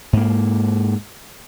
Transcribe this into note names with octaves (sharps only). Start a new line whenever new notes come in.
G#2 A#3